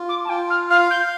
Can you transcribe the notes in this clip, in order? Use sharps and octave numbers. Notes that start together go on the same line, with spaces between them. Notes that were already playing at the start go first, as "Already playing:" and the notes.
Already playing: F4
D6
A5
F4 G5
F6
F5 F6
G6